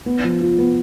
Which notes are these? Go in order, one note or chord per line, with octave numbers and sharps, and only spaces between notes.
B3
F3
F4
B3